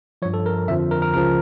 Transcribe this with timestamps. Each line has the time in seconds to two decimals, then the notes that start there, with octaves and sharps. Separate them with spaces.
0.22 F3 C#5
0.25 G2
0.34 A4
0.46 A#4
0.68 F2 D3 F3 E5
0.91 A#4
1.02 A#4
1.14 C#2 C#3 F3 A#4